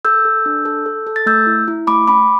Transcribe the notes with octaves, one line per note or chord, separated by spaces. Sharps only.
A4 E6 G6
A4
D4
A4
A4
A4
A6
A3 E6 G6
E4
E4
A3 B5 D6
C#4 B5 D6